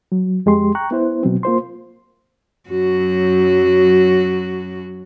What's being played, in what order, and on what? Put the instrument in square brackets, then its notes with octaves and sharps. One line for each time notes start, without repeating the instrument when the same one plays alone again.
[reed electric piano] F#3
F2 G#3 G4 C6
G5 A#5 C#6 F#6
B3 E4 C5
B2 F#3 C4
A#3 F4 C5 C6
[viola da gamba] F#2 F#3 F#4